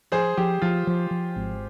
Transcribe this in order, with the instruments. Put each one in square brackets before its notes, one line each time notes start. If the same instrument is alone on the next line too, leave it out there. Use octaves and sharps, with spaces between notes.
[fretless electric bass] F3 [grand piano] G#4 C5
[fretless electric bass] F3 [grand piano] G4
[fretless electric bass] F3 [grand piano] F4
[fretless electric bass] F3
F3
G#1